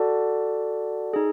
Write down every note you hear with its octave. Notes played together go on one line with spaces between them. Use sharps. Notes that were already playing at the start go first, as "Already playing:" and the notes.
Already playing: F#4 A4 D5 F#5 A5
D#4 G#4